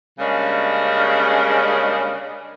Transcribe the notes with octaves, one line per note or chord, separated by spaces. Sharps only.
C#3 G3 G#3 A#3 C#4 D4